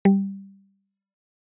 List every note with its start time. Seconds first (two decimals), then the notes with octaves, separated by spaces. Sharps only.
0.05 G3